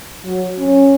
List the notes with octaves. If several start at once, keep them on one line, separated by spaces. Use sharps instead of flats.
F#3
C#4